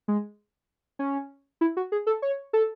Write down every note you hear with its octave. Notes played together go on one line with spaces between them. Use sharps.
G#3
C#4
E4
F#4
G#4
A4
C#5
A4